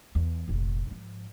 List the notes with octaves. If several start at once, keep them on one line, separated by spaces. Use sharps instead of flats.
E2
F1 A#1
G#2 F3